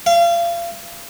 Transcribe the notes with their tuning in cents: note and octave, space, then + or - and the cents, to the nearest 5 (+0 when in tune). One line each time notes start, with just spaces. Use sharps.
F5 -35